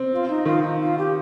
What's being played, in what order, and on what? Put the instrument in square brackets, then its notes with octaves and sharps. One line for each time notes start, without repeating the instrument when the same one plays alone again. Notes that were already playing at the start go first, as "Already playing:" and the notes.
Already playing: [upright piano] C4
[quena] F4
D#4
[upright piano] D#3 [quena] F4
[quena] D#4
F4
G4